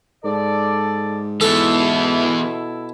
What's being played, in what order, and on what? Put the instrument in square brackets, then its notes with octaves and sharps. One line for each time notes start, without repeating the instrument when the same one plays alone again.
[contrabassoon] G#2 [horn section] A4 D5
[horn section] B2 E4 [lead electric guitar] E3 B3 [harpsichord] A4